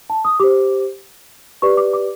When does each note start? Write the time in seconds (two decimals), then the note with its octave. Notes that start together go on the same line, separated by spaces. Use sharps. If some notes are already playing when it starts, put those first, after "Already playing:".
0.10 A5
0.25 D#6
0.40 G4 C5 D6
1.62 G4 B4 D5 C#6
1.77 D6
1.93 D6